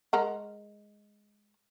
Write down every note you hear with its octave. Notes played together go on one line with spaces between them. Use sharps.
G#3 A#4 F#5